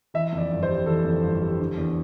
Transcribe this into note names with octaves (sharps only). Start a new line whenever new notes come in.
E3 E5
F2
D5
G1
C5
G3
E3 A4
F2
G1
G3
D3
E2